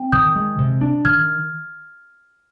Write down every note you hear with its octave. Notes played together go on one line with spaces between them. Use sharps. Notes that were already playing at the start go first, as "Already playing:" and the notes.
Already playing: C4 G5
D#3 D#6 G6
G#3
C3
D4
D#3 F6 G#6